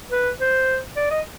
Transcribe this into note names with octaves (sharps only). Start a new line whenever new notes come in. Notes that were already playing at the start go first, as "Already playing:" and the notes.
B4
C5
D5
D#5